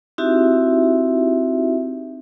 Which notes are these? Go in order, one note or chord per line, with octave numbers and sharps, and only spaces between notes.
C4 D#4 E4 F#4 G4 E5